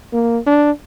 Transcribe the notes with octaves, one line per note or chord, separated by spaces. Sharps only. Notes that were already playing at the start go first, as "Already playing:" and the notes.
A#3
D4